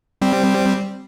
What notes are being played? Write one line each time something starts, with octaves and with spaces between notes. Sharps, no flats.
G3 C4